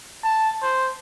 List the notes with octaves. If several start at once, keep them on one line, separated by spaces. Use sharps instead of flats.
A5
C5